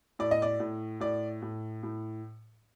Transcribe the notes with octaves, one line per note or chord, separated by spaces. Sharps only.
A2 D5
D#5
D5
A2
A2 D5
A2
A2